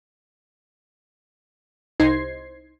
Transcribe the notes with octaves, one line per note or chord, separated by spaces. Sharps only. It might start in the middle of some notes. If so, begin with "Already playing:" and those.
C2 D#4 C5 G#6 C7